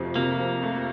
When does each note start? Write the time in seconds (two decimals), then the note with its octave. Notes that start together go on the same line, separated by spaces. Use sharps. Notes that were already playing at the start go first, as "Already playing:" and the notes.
Already playing: F2 C3 F3 A3
0.16 C3 A#3
0.39 F3
0.63 A3